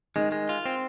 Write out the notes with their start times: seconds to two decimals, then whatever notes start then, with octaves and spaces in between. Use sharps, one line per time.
0.15 D#3 G#3
0.32 G#3
0.49 F4
0.66 C4